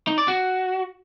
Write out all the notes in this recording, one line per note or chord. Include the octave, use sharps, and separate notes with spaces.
D#4
D5
F#4